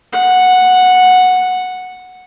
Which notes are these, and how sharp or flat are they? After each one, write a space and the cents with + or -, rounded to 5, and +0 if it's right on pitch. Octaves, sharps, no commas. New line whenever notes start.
F#5 -5